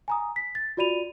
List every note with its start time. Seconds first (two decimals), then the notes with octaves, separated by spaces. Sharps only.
0.08 G#5 A#5 D#6
0.36 B6
0.55 A6
0.77 F4 F#4 D5 B5 D#7 F7